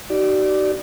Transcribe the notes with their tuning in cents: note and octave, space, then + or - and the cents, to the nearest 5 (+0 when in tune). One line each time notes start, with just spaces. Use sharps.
D#4 -5 G4 -45 D5 +0